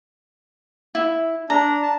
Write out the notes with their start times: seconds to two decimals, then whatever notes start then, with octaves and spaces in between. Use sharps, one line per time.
0.95 E4
1.50 D4 A#5
1.83 A5